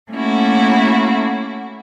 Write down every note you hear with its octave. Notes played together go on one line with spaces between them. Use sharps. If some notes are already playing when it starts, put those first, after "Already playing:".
A3 A#3 C#4 E4 F#4